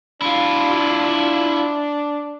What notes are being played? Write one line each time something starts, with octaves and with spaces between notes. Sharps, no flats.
D4 E4 F4